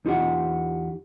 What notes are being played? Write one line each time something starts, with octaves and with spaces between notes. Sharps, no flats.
E2 D#4 F4 G4 F#5